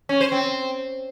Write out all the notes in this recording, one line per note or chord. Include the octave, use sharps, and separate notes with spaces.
C#4
C5
C4